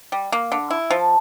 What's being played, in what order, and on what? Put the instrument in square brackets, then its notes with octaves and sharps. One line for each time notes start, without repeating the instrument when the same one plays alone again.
[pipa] G3
A#3
D3
E4
F3
[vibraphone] A5